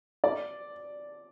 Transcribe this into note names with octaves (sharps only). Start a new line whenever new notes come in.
D5